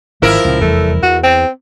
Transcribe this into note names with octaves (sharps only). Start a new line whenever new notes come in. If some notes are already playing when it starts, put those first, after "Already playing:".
G#1 D#3 F3 G#3 E4 A#4
C#2 A#2
F1 E2 G3 A3
E2 F#4
C4